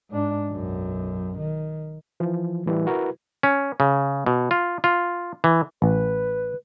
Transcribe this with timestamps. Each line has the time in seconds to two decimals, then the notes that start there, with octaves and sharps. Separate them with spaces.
0.11 G#2 D4
0.52 B1 F#2
1.39 D#3
2.20 E3 F3
2.66 A2 E3 G3
2.86 E4 F#4 A#4 B4
3.43 C#4
3.80 C#3
4.26 B2
4.51 F4
4.84 F4
5.44 E3
5.82 A1 B4